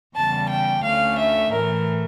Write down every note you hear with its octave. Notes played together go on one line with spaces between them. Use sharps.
E2 C#3 G3 A5
G5
D2 D3 A3 C#4 F5
E5
A2 E3 A3 A#4